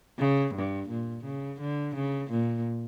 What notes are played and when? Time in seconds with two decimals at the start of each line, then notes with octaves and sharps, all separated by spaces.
0.18 C#3
0.54 G2
0.89 A#2
1.24 C#3
1.60 D3
1.95 C#3
2.30 A#2